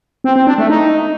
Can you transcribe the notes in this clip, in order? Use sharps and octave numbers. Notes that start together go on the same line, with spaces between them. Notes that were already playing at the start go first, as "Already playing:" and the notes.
C4
C4
D4
A3
D#4